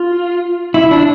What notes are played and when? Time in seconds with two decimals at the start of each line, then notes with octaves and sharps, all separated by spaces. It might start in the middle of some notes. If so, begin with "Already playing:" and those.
Already playing: F4
0.74 E4
0.91 D4